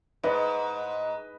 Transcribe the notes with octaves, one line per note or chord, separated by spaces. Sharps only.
G#2 B4 D#5